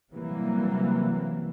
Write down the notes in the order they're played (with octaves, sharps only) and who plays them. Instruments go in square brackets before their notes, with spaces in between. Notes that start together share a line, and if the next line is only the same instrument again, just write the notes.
[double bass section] C3 E3 F#3 G3 A#3